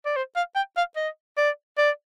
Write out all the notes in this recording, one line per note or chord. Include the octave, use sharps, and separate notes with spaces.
D5
C5
F5
G5
F5
D#5
D5
D5